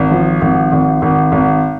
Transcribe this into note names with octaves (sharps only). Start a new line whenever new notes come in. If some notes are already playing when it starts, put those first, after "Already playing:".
Already playing: G#1
F3
G#1
G#1
G#1
G#1